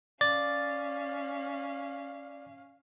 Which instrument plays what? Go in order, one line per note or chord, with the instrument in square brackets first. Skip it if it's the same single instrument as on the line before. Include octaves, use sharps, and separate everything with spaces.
[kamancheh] C#4 F5 [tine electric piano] D5 A6